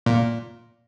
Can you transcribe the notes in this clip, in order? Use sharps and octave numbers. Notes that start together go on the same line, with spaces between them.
A#2